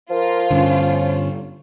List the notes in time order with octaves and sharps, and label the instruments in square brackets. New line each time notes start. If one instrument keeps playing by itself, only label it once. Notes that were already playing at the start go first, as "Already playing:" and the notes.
[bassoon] F3 [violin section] F4 [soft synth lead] A#4
[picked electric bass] G2 D3 [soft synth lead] C#4